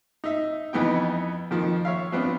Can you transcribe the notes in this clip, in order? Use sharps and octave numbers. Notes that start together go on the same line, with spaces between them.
D#4 E5
F2 E3 B3 D#4 G5
F2 D#3 F3
C#5 E5 F5
F3 B3 C4 D4